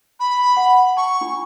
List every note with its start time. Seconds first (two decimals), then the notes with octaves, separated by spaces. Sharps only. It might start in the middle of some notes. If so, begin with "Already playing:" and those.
0.20 B5
0.57 F#5
0.97 A5 C#6
1.21 D4 F4